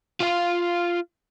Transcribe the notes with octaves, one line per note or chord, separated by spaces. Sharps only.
F4 F5